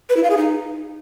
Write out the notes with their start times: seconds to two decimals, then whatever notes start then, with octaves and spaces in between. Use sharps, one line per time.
0.10 B4
0.16 E4
0.23 F5
0.30 G#4
0.37 D#4